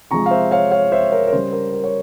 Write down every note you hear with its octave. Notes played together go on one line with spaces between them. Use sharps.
C3 F3 G#3 A#5 C#6
F5
C5 E5
C#5 F5
C#5 F5
C5 E5
A#4 C#5
A#4
C#3 G3 C5
A#4
A#4
C#5